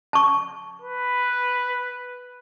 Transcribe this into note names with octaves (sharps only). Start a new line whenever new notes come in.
A5 C#6
B4